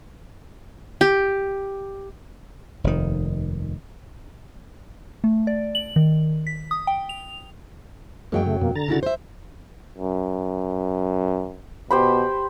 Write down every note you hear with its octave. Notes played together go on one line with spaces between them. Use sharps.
G4
F1 D#2 D#3
A3
D5
F#7
D#3
B6
D#6
G5
F7
F#2 F#3 G#3 A#3 G5
C#3 A3
F2 B2 A#3
D3 A#5 A6
C#3 E4 F#4
C5 E5
F#2
B2 G4 C5 B5